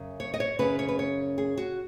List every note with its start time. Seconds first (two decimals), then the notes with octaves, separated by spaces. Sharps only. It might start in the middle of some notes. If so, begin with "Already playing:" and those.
Already playing: F#2 C#3
0.20 C#5
0.34 D#5
0.40 C#5
0.59 F#2 C#3 B4
0.79 C#5
0.89 B4
0.99 C#5
1.38 G#4
1.57 F#4